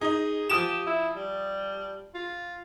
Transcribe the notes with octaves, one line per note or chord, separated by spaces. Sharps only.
D#4 G#4 D#5
F3 G4 D#6 E7
E4
G3
F4